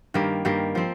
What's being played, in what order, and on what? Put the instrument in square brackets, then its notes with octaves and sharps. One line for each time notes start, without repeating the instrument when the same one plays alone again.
[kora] G2 D#3 G3 A#3
G2 D#3 G3 A#3
F3 C4